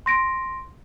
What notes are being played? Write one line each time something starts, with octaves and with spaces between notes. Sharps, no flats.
C6 A#6 D7